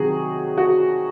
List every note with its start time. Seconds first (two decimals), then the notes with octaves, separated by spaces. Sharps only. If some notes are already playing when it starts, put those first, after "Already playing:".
Already playing: C3 D#3 F#3 F#4 G#4
0.58 F#4